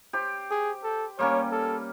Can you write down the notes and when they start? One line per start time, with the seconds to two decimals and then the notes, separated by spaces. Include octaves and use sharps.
0.13 G4 C5
0.51 G#4
0.84 A4
1.19 G3 A#3 C#4 C#5
1.52 A4